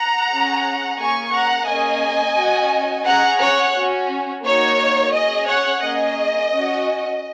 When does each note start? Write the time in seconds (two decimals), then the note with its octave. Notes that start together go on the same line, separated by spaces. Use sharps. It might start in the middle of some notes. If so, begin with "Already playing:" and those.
Already playing: F#5 A#5
0.29 C#4 G#4
0.99 A#3 C#4 G#4 G#5 C#6
1.33 F#5 A#5
1.67 A#3 C#4 G#4 D#5 G#5
2.37 C#4 F#4
3.06 C#4 G#4 F#5 A#5
3.40 C#5 F#5
3.75 C#4 F#4
4.44 A#3 D#4 F#4 C#5
5.13 C#4 G#4 D#5
5.47 C#5 F#5
5.82 A#3 C#4 G#4 D#5
6.51 C#4 F#4